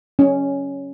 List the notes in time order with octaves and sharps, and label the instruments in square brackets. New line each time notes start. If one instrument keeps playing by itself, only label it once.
[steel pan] C#4